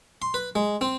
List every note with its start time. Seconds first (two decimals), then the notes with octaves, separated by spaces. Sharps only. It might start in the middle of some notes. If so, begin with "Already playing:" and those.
0.22 C6
0.34 B4
0.55 G#3
0.81 C4